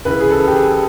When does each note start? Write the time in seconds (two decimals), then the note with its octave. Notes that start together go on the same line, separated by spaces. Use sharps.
0.05 C#2 C#3 E3 B4
0.20 G#4
0.31 A4
0.48 G4
0.56 G#4